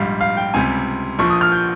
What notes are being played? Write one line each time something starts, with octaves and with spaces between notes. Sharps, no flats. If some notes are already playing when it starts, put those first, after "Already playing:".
Already playing: A#1 G#2 G3 F5
F5
G5
C#2 C3 G3 G#5
A#1 A#2 F3 C#6
D#6
F6
G6